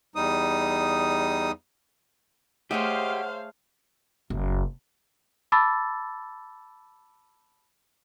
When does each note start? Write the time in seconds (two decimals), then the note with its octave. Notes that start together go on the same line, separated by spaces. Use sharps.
0.15 E2 G3 D#4 D#6
2.71 A3 G4 G#4 C5 C#5 D#5 F5 F#5
4.30 F#1
5.52 A5 B5 D6 E6 A6